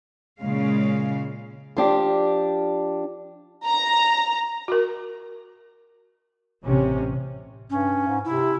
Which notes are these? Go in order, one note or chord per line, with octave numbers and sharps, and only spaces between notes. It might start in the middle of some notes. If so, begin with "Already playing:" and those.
A#2 C#3 G#3 F5
F3 D4 G4
A#5
F#4 A#4
A1 C3 C#4
G2 C#4
G#2
C3 E4